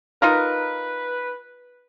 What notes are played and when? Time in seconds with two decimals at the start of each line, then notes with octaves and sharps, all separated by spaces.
0.22 D#4 F4 A#4 B4